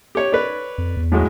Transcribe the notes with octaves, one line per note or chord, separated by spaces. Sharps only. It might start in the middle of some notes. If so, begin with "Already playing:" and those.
G4 C#5
B4 C#5 D5
F2
E2
A2 F#3 G#3